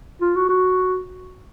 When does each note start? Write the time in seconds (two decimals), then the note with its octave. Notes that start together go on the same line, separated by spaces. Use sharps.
0.21 F4
0.36 F#4
0.49 F#4